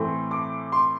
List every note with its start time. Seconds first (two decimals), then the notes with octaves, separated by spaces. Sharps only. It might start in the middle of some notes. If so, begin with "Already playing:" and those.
Already playing: A2 E3 A3 C4
0.31 D6
0.72 C6